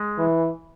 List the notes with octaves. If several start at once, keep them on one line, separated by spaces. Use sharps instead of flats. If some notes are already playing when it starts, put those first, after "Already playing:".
Already playing: G#3
E3